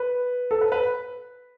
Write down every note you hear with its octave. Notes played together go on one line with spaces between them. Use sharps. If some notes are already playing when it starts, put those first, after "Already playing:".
Already playing: B4
A4
B4
B4